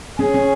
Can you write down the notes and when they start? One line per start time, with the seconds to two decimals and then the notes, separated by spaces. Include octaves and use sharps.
0.19 C#4 G#4
0.34 C#4